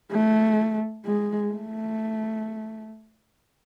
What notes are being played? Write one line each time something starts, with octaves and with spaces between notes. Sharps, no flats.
A3
G#3
A3